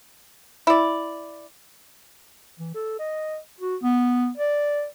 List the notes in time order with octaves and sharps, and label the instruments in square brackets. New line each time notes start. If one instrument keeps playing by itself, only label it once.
[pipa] E4 D5
[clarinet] E3
A4
D#5
F#4
B3
D5